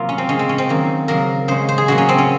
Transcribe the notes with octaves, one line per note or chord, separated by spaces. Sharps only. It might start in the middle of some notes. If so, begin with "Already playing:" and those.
Already playing: C3 F#3 A#3 F4
C#4
C4
C#3 G#3 C#4
C4
C#4
C4
D#3 F#3 A#3
C#3 F#3 A#3 A#4
C#3 G#3 C5
C5
G#4
C#3 F#3 A#3 F#4
C#4
C4
C#4